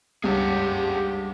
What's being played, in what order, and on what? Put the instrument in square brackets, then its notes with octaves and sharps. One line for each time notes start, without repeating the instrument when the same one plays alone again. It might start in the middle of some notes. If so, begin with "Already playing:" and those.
[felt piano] C#2 G2 [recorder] G4 [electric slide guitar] G#4 C#5 F#5